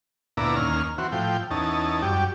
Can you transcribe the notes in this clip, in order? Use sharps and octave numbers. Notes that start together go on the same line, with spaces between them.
D2 A#2 B3 E4 D5 A#5
D#2 A#3 C#4 F6
E3 C4 F#4
A2 F3 G5
E2 C#4 D#4 A5
F#2 G3 G4